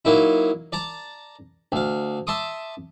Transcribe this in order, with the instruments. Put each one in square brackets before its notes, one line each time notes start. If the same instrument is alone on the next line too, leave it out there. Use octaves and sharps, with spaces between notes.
[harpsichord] F#3 A#3 D#4 E4
D5 A5 A#5
D2 F5
E5 A5 C6 D6 D#6